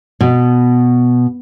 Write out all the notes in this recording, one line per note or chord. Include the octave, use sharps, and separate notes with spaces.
B2